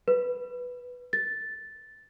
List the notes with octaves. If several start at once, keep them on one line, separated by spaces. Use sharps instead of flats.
B4
A6